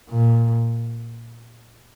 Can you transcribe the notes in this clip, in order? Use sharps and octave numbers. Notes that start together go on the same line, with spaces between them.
A#2